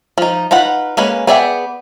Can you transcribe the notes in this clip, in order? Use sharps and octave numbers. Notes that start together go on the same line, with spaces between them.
F3 D#4
D#4 F4 B4 F#5
G#3 A#3 C#4 B4
B3 G#4 D5 E5 G5